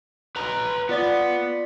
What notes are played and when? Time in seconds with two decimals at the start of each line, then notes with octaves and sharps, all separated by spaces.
0.36 B4 A#5
0.89 B3 F4 D5